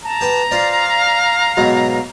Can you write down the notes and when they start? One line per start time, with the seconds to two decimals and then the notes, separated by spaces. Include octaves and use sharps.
0.05 A5 A#5
0.21 G4 B4 G5
0.51 F4 C5 D5 F5
1.57 G#2 B2 F#3